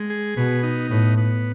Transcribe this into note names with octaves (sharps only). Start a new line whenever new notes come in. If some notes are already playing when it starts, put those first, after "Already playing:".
Already playing: G#3
G#4
B2 B3
D#4
A2 B3
B3